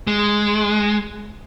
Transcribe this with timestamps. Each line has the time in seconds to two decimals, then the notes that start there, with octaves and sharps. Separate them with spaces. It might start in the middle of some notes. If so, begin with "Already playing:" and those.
0.07 G#3